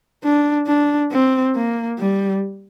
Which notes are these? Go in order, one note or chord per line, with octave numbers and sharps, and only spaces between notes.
D4
D4
C4
A#3
G3